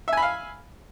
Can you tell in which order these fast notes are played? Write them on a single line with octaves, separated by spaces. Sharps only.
E5 G#5 B5 F5